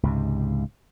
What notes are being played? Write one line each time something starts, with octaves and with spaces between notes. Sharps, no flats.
C#2 G#2 C3